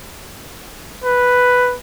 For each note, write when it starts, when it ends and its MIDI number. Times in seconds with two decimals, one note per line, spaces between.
1.04 1.75 71